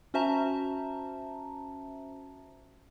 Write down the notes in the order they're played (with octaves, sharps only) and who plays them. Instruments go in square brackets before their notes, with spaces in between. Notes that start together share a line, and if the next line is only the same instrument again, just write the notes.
[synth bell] C#4 F#4 C5 E5 A5 A#5